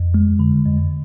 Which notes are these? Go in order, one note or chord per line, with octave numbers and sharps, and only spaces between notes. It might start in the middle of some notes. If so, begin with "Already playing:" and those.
Already playing: F2
G#3
D3
F2